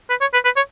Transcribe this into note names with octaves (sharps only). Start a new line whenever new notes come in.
B4
C#5
B4
B4
C#5